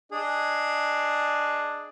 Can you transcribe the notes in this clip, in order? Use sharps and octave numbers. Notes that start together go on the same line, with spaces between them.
D4 G#4 D#5